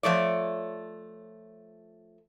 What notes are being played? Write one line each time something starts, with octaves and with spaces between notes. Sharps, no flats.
F3 A3 C#5 D5